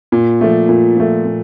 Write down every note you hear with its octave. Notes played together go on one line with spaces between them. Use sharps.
A#2
F3 A3
A#2
F3 A3
A#2